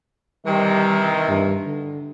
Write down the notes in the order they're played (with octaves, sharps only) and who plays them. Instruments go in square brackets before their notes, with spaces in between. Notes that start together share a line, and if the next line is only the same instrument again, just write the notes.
[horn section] C3 D#3 E3 [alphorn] G3
[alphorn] G2
D3